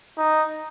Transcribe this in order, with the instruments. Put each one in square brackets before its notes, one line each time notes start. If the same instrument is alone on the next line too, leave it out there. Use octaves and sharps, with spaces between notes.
[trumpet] D#4